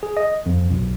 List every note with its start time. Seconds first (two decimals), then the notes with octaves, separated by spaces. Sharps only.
0.03 G#4
0.17 D#5
0.46 F2
0.71 B1